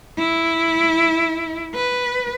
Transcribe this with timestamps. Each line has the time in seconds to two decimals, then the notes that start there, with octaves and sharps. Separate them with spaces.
0.18 E4
1.75 B4